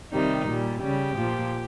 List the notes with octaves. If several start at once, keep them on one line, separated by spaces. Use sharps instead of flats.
C3 D#3 G3 D#4
A#2 G3
C#3 G3 G4
A#2 F3